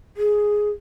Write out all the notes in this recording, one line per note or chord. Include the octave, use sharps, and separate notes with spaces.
G#4